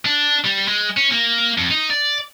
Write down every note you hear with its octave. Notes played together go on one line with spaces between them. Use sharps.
D4
G3
G#3
C#4
A#3
F2
D#4
D5